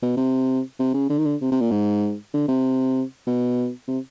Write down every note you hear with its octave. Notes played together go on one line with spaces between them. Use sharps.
B2
C3
C3
C#3
D3
D#3
D3
C3
C3
A#2
G#2
D3
C3
B2
C3